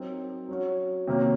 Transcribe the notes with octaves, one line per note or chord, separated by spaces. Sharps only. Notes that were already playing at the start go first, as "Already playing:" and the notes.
Already playing: F#3 C4 D#4 A#4
F#3 C#4 F#4
C3 D#3 F#3 A#3 C#4